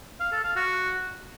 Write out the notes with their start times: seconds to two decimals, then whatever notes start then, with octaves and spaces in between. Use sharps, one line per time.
0.20 F5
0.32 A4
0.44 F5
0.56 F#4